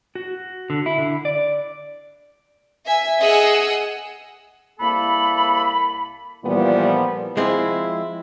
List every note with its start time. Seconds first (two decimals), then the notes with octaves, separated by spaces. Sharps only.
0.15 F#4
0.70 D3
0.86 E4
0.98 D3
1.25 D5
2.84 E5 G#5
3.19 G#4 D#5 F#5 D#6 E6
4.80 C2 A#3 E4 A4 B5
6.44 A#2 E3 F3 G3 A#3 B3
7.37 F3 G#3 C4 E4